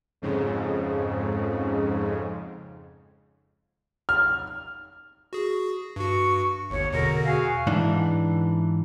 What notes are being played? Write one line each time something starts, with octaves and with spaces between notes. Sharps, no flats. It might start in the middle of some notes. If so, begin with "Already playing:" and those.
F2 G#2 C#3
F6
F#4 G#4
G2 F#4 C#6
G1 D#2 C#5
E2 B2 D3 A#4
F#4 G#4 F5
G#2 E3 D4